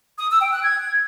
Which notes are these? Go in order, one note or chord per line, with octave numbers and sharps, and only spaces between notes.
D#6
E6
G5
F#6
G#6